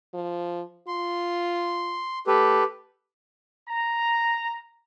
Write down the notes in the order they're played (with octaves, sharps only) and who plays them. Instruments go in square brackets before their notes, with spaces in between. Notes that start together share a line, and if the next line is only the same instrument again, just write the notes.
[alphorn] F3
[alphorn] F4 [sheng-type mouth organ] C6
[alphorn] A3 [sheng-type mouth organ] G4 A4 B4
[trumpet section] A#5